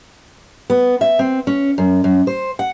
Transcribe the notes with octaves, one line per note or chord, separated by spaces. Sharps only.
B3
E5
C4
C#4
F#2
F#2
C5
F#5